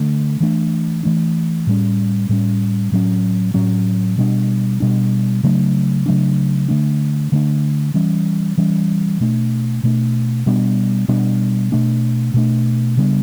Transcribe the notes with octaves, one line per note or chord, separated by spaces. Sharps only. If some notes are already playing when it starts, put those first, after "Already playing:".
Already playing: D3 A3 D4
E3 A3 D4
E3 A3 D4
A2 G3 C#4
A2 G3 C#4
A2 F#3 C#4
A2 F#3 C#4
B2 G3 D4
B2 G3 D4
C#3 F#3 A3 D4
C#3 F#3 A3 D4
D3 A3 D4
D3 A3 D4
E3 G3 C#4
E3 G3 C#4
B2 A3 D4
B2 A3 D4
B2 G3 B3 D4
B2 G3 B3 D4
B2 A3 D4
B2 A3 D4
C#3 G3 B3 D4